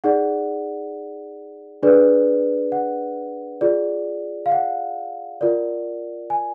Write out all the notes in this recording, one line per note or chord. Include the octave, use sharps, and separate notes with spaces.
D#4 G#4 D5 F#5
D4 G#4 B4 D5
F#5
F4 G#4 D5
F5
F#5
F4 A#4 D5
G#5